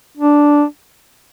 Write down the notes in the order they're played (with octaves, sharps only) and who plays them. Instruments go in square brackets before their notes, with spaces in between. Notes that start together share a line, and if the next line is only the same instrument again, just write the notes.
[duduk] D4